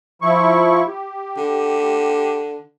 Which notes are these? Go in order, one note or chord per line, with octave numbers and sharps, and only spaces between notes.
F3 E4 C#6
G4
D3